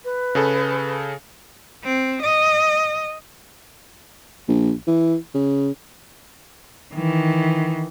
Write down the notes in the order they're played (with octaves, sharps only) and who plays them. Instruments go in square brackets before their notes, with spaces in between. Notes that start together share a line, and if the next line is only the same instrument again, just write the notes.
[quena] B4
[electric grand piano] C#3 G#4 A4
[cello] C4
D#5
[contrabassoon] A#1
E3
C#3
[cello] D#3 E3